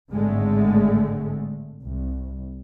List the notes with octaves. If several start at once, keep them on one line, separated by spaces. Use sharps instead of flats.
G#1 A2 D3 G#3 A3
C2